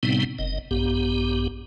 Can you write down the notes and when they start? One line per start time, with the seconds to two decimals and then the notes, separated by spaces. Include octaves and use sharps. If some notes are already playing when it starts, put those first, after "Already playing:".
0.03 A2 C3 G3 B3 C4 D#4
0.39 F#1 D#5
0.71 A#1 G2 B3 G4